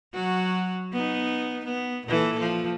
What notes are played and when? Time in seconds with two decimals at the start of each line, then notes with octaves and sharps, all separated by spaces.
0.14 F#3 F#4
0.93 B3 D#4
1.65 B3
2.07 A#2 E3 A4
2.39 F3